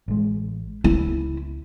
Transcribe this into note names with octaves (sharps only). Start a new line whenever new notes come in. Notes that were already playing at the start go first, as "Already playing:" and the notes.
A1 G#3
C#2 C#3 B3 E4